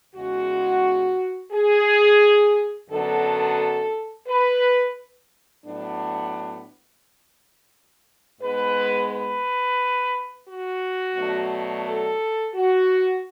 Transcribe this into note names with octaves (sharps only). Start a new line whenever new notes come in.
E2 C#3 G#3 F#4
G#4
F#2 D3 F#3 B3 D4 A4
B4
A2 F#3 B3 D4
G#2 G#3 B3 B4
B4
F#4
B2 F#3 A3 D4
A4
F#4